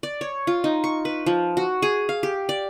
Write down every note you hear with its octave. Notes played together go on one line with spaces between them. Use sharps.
D5
C#5
F4
D#4
C#6
B4
F3
F#4
G#4
F5
G4
D5